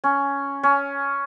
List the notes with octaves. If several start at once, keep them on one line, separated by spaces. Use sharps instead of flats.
C#4
C#4